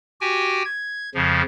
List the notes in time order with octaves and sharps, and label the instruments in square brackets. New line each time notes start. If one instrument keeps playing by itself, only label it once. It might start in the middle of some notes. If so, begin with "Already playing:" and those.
[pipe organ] F#4 G4 G5 G#5
G#6
F2 C#3 F3